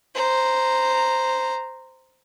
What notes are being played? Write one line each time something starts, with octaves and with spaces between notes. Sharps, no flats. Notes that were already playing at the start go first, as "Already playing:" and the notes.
C5 A#5